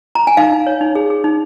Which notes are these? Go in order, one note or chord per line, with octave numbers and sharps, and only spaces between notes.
A#5
G#5
D#4 F5
D#4
C#5
D#4
G#4
G#4
D#4